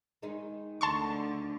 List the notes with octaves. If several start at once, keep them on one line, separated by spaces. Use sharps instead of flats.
D#3 G#3 D#4
D2 D3 A5 C6 C#6